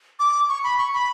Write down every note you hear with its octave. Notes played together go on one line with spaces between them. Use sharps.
D6
C#6
B5
C#6
B5